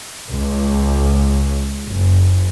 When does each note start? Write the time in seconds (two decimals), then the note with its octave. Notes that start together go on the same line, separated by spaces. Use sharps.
0.28 C#2
1.85 F#1